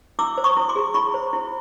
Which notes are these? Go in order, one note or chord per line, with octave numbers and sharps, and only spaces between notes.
E4 D6 E6
C5
C#6 D#6
E4
C6 D6
G#4
E4 B5 C#6
C5
E4